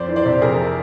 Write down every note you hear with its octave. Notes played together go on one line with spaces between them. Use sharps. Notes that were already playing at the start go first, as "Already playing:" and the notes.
Already playing: F2 C5 D5
E3
C5 D5
C3
F2 G#4 A#4